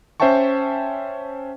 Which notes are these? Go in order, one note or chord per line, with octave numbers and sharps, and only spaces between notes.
C#4 C5 E5 G5 A5 C#6